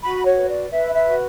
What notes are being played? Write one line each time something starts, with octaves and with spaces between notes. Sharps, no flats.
F#4 B5
C#5
B4
D5
B4 E5
E5
F#4